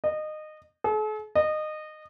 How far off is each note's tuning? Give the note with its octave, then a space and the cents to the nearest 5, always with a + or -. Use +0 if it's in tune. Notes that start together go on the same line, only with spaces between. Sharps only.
D#5 -20
A4 -45
D#5 -20